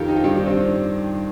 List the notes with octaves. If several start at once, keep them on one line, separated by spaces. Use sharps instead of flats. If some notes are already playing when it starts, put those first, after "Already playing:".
Already playing: F2 D#3 F4 G4 A4 A#4
D#4
F4
G2 D#3 G4
D4
C4